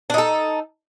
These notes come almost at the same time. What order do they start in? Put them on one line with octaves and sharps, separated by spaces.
D4 D#4 A4